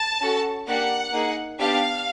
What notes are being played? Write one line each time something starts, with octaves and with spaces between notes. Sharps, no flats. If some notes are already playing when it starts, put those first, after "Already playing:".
Already playing: A5
C#4 F#4 A4
A#3 D4 G4 F#5
A#3 D#4 G#4
B3 D4 G4 F5